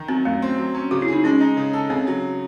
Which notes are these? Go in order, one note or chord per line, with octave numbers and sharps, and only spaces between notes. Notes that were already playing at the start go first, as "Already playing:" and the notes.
Already playing: D#3
F#3 C4
F#2 A3
C4
F#3
C#4
C#3 F#4
E4
D#4 G#4
G#3 C#4
D#4
C#3
A4
C#3 C4
F#3